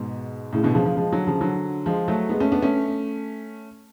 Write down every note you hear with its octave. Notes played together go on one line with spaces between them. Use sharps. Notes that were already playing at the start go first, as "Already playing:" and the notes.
Already playing: G#2 B2
A2 C#3
B2 D3
C#3 F3
C#3 F3
F3 G#3
D3 F#3
C#3 F3
D3 F#3
F3 G#3
F#3 A3
G#3 B3
A3 C#4
B3 D4
A3 C#4